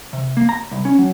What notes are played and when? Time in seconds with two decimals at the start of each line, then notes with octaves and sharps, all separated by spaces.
0.13 C3
0.37 A#3
0.49 A#5
0.71 C2
0.85 C#4
0.99 F#3